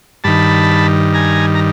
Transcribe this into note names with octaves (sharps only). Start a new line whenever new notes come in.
G2 D#3 A5 B5
G#5 A#5
A#5